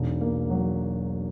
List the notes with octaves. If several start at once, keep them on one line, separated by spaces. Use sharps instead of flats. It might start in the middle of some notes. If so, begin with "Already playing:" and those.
Already playing: E1 B1
A#3
F#3